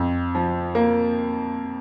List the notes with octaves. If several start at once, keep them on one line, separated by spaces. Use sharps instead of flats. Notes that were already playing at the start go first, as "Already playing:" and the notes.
Already playing: F2
F3
A#3